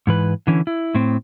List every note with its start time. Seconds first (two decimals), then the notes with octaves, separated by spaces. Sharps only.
0.07 G#2 E3 B4
0.47 D3 E3 C#4
0.67 E4
0.95 A2 C4